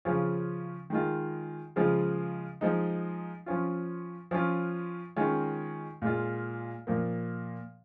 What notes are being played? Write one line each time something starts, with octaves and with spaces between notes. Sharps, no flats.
C#3 F3 C#4 F4
D#3 G#3 F4
C#3 F3 G#3 F4
F3 G#3 D#4
F3 C#4 F4
F3 C#4 F4
D#3 G#3 C#4 F4
A#2 G#3 F4
A#2 F3 A#3